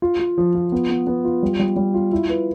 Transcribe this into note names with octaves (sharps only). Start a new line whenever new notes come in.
F4
F4
F3
F4
B3
B3
B3
F4
G3
G3
G3
F4
E4
B4